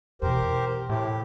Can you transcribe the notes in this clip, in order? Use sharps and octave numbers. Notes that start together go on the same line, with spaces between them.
E2 B2 G4 A#4 C5
A2 G4